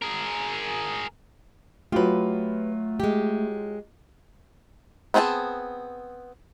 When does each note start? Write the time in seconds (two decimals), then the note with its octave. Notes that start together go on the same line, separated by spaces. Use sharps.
0.02 G#4 A#4
1.92 F#3 A3 F4 G4 B4
3.00 G#3 G4
5.14 B3 C4 G#4 G5 A5